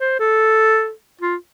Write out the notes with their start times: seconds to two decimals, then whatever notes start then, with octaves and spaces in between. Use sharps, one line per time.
0.01 C5
0.20 A4
1.21 F4